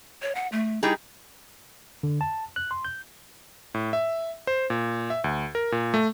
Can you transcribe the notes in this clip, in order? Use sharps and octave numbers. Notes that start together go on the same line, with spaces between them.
C#5
F#5
A3
G3 D#4 E4 G#4
D3
A5
F#6
C6
G6
A2
E5
C5
A#2
E5
D2
A#4
A#2
A3